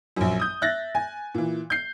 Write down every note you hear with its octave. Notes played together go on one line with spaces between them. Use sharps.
A#1 F#2
D#6 G6
E5 F#6 A6 A#6
G#5
A#2 E3
G6 C7